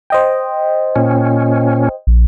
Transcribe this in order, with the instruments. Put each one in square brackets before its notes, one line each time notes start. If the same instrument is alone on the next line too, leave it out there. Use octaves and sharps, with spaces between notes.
[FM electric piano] C5 D#5 G5
[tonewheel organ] A#2 C#4
[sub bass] A#1